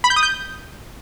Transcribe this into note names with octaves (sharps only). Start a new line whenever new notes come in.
B5
G6
D#6
G6